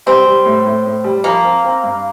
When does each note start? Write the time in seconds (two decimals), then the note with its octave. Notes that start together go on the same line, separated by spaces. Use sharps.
0.06 G3 C4
0.26 G3
0.46 A2
0.66 A2
0.86 A2
1.04 G3
1.24 F3 A#3
1.44 C4
1.64 C4
1.83 G2